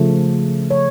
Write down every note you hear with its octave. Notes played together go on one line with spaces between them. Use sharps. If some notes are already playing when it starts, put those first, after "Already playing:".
Already playing: C#3 F3 A3
C#5